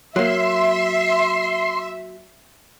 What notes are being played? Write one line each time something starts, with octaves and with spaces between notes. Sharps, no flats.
F#3 A#3 E5 C6